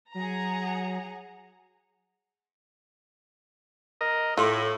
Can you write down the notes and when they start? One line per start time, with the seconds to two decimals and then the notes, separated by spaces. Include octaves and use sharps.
0.14 F#3 G#4 F#5 A#5
4.01 A#4 D#5
4.37 A2 E4 F4